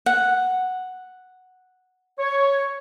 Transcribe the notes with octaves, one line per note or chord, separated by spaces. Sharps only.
F#5
C#5